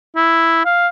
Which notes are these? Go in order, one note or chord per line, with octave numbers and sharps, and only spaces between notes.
E4
F5